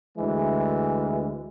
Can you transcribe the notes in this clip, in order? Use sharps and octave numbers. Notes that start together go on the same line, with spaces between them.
D2 E3 G#3